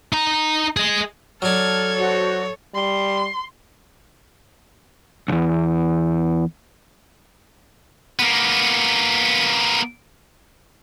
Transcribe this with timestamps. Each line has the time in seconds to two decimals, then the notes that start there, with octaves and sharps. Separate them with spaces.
0.13 D#4 A#5
0.77 G#4 D#5
1.42 F#3 D4 A4 F6 G#6
1.97 F#4 C5 C#5
2.75 G3 C6
5.28 B1 E2
8.19 A#3 B3